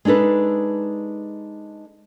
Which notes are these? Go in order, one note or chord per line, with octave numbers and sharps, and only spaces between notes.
G#3 D4 D#4 A4 B4